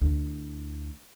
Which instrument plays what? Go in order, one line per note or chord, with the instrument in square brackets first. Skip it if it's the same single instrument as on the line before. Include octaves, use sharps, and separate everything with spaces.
[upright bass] D2 E4